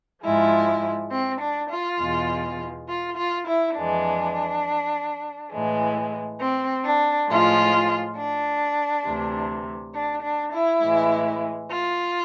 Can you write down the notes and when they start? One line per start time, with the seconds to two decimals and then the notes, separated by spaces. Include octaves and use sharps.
0.23 G#2 F3 G#3 E4
1.10 C4
1.40 D4
1.70 F4
1.99 E2 B2 G#3
2.88 F4
3.17 F4
3.47 E4
3.75 F2 E3 G#3 D4
5.52 A2 E3 G#3
6.40 C4
6.84 D4
7.29 A2 F3 G#3 F4
8.16 D4
9.05 D2 C3 E3
9.93 D4
10.22 D4
10.52 E4
10.82 A2 E3 G#3
11.70 F4